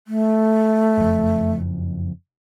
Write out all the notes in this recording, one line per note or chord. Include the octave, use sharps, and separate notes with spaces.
A3
F#1 F2